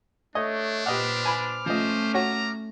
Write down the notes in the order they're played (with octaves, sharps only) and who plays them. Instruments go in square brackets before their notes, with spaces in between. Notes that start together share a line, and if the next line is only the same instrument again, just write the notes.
[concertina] A3 C#5 [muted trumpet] D4 [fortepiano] D#5
[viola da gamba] A#2 B4 C5 [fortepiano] G4 D#5 F#5 [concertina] D6 F6
[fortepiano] G#5 B5
[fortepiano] F3 D#5 [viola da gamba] A3 C#4 [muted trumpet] C5
[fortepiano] F#4 C#5 [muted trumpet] A#5